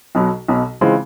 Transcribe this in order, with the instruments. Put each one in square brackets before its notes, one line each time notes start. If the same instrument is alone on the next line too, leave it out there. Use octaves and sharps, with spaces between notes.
[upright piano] B1 B2 F#3
B1 B2 F#3
C#3 E3 G#3 C4 F4